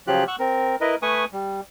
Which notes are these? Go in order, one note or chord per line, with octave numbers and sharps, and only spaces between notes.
C#3 F3 F#3 F4 G4 F#6
F#5 C#6 E6 F#6
C4 A#4
E4 A#4 B4 D#5
A3 B4 G#5 C#6 D#6
G3